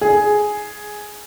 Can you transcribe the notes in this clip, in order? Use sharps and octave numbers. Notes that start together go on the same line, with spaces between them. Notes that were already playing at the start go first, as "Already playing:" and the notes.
G#4